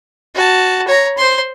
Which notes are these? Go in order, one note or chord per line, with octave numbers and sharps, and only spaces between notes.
F#4 A5
C#5 A#5
C5 C6